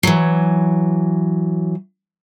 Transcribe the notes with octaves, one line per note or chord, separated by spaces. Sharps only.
E3 F#3